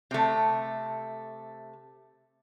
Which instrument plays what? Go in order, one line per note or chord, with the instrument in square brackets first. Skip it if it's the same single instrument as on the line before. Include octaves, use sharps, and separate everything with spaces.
[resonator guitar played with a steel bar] C3 A3